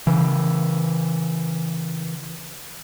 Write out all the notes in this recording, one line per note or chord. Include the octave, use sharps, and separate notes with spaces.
C#3 E3